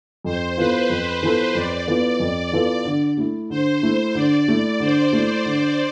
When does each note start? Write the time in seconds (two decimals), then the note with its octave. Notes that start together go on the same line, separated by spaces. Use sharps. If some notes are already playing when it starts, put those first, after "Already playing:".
0.25 F2 C5
0.58 E3 B3 F4 A4 B4
0.90 F2 C5
1.22 E3 B3 F4 A4 C5
1.55 F2 D5
1.87 E3 B3 F4 A4
2.20 F2
2.52 E3 B3 F4 A4
2.85 D3
3.17 A3 E4
3.50 D3 C5
3.83 A3 E4 C5
4.15 D3 D5
4.48 A3 E4
4.80 D3 C5
5.13 A3 E4
5.45 D3